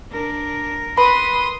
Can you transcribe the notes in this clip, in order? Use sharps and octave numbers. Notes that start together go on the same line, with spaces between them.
D4 A#4
B4 B5 C6 D#6